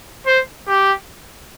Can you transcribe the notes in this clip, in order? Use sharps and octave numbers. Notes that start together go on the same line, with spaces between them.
C5
G4